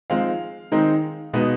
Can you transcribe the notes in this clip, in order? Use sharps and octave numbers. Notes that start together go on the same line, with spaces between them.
F3 G#3 C4 D#4 F5
D#3 G#3 C4 D#4
B2 G#3 B3 D#4